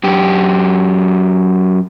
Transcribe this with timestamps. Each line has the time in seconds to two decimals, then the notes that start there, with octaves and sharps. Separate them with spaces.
0.04 F#2 G4